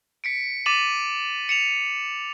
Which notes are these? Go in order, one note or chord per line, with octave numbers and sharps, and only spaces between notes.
B6 C#7 D7
D6 A6 B6 D#7 E7 F#7
C#7 E7 F7